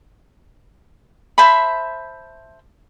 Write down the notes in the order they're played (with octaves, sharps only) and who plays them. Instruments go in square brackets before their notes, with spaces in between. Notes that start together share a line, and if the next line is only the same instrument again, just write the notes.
[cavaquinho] C5 E5 A5 B5